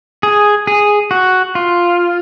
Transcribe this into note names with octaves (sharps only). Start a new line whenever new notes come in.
G#4
G#4
F#4
F4